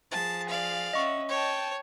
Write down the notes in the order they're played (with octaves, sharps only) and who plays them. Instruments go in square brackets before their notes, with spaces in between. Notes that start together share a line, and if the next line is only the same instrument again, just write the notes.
[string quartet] F3 G#4 [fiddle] A5
[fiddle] D5 F5
[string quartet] C#4 E5 F#5 [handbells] D#5 C#6
[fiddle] C#5 [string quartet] G5 A5